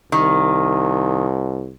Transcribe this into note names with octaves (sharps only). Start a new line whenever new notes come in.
C2 D#3